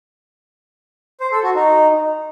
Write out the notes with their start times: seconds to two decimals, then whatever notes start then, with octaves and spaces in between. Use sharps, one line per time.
1.20 C5
1.32 A4
1.43 F#4
1.55 D#4